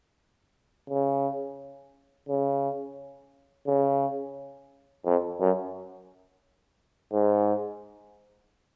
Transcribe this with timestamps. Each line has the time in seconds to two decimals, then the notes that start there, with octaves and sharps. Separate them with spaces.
0.90 C#3
2.29 C#3
3.67 C#3
5.05 F2
5.40 F#2
7.12 G#2